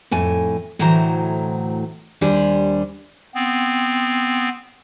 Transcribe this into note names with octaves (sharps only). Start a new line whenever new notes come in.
F2 A2 G#5
D2 A2 E3 F#3 C5 A#5
D#2 G3 D4 C5 G#5
B3 C4